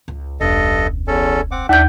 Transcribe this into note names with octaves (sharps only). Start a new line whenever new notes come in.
C#2
E1 C#2 G2 A4 D#5
E2 C#4 A4
C4 F#5 D6
D#2 D4 E5 G6